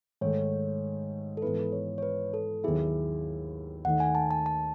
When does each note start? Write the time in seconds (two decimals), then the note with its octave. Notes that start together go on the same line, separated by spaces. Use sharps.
0.21 G#2 D#3 A3 C#5
1.37 A4
1.42 G#2 E3 B3 E4 B4
1.72 C#5
1.98 C#5
2.02 B4
2.34 A4
2.64 D#2 D#3 F#3 B3 E4 G#4
3.85 D#2 D#3 A3 D#4 F#5
4.00 G#5
4.15 A5
4.31 A5
4.46 A5